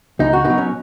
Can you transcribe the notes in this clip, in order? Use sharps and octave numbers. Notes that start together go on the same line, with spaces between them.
C#2 D#4
F#4
B2 D#4
F#3
C#4